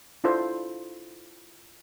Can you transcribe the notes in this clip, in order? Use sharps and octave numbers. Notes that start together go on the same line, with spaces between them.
D4 E4 F4 A4 C5